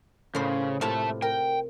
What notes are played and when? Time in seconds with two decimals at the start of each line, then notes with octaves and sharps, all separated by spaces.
0.35 A2 C#3 C5
0.81 A2 C3 A3 F4 A5
1.22 A#4 G5